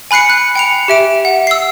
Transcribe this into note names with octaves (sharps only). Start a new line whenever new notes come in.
G#5 B5 F#6 C7 C#7
F#6
G5 C#7 F7
G4 E5 D7
F#5
E6 C7